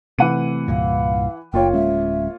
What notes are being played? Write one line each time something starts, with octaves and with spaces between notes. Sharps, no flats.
C3 E3 A3 F#5 D#7
C2 G2 A#2 F5
F#1 A#3 F4 C#5 G5
D1 G#3 C#4 E5